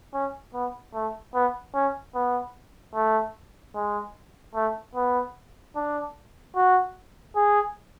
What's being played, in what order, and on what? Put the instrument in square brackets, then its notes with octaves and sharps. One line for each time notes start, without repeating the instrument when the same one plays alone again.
[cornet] C#4
B3
A3
B3
C#4
B3
A3
G#3
A3
B3
D4
F#4
G#4